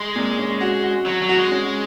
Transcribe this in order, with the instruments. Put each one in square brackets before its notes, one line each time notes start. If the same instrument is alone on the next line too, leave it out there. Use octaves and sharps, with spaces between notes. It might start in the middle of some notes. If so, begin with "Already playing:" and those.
Already playing: [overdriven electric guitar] G#3
[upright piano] A#2
C#4
F#4
F#4
[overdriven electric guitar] F#3 [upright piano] F#4
[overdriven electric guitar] F#3
[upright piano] F#4
[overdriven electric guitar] G#3
[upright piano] C#4